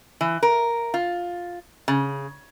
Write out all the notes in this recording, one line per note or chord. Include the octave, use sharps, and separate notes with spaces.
E3
A#4
F4
C#3